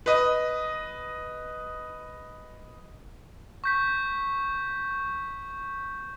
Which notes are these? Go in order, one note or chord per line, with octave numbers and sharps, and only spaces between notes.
B4 D#5
C#6 G6 B6